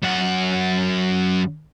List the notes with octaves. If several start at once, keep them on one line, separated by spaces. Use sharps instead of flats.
F#2 F#5